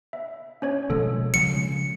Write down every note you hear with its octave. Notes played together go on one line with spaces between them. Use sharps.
E5
C#4 C#5 G#6
B2 F3 G#3 A4
C#3 F3 G#3 C#7